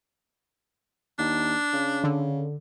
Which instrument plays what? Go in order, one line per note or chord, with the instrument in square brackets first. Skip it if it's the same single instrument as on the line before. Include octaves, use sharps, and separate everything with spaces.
[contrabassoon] D#2 [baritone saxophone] D4
[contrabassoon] C#3
[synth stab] D3